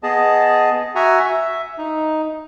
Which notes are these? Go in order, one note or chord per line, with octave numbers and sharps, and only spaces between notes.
B3 G#4 D#5 A5
F#4 E5 F#5 G#5 A#5
E5
D#4